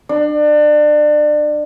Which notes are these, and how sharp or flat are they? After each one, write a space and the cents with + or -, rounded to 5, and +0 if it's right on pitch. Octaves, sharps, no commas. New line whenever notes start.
D4 +30